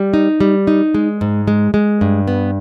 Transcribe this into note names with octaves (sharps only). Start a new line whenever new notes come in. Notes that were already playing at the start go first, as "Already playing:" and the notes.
Already playing: G3
D#4
G3
D#4
G#3
G#2
G#3
G#3
G2
B3